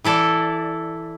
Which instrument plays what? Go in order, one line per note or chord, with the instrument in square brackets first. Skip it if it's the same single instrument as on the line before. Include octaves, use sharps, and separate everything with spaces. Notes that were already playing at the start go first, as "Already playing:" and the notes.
[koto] E3 E4 A4 D5